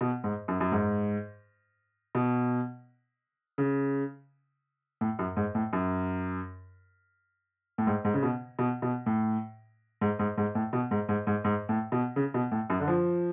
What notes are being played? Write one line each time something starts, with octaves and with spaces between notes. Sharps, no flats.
B2
G#2
F#2
F#2
G#2
B2
C#3
A2
F#2
G#2
A2
F#2
A2
G#2
G#2
C#3
B2
B2
B2
A2
G#2
G#2
G#2
A2
B2
G#2
G#2
G#2
G#2
A2
B2
C#3
B2
A2
F#2
D3
F3